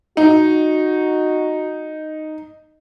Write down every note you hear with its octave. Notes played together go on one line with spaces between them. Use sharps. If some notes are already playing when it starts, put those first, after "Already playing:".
D#4 F#4